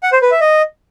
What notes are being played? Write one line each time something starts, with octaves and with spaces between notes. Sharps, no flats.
F#5
C5
B4
E5
D#5